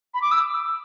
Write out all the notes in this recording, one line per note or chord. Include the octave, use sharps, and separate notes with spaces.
B5
D6
E6